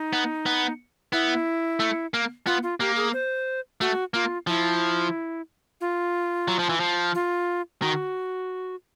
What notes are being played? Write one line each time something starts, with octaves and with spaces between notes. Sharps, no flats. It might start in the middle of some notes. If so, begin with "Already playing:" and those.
Already playing: D#4
B3
B3
B3 E4
A3
A#3
B3 F4
F4
A#3 G4
G#4
C5
A3 F#4
A#3 F4
F3 E4
F4
F#3
F3
E3
F3
F4
D#3 F#4